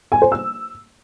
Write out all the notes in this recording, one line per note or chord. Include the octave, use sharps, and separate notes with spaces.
G#5
C5
E6